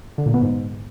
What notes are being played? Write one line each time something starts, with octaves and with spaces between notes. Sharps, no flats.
D3
A#2
B3
G#2